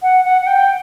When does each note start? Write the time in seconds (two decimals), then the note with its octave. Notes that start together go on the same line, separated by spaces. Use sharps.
0.02 F#5
0.25 F#5
0.41 F#5
0.47 G5